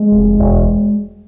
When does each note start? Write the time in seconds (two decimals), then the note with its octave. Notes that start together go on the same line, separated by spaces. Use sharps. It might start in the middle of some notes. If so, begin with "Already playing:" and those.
Already playing: G#3
0.12 F1
0.39 E1